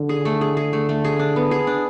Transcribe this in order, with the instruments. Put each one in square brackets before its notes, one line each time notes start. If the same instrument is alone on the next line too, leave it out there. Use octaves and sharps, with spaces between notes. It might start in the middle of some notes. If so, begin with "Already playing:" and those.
Already playing: [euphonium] D3
[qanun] G#4
A3
G#4
G#4
A3
A3
G#4
D4
B3
G#4
D4